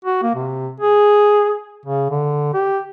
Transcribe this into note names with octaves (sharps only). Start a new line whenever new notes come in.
F#4
A#3
C3
G#4
C#3
D3
G4